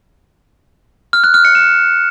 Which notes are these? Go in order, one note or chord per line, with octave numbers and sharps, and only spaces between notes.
F6
F#6
F6
C#7
E7